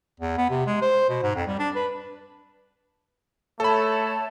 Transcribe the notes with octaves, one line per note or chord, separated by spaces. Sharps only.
E2
B3
C3
G#3
C5
B2
G#2
F2
G3
D4
B4
A3 A4 C#5 A5 B5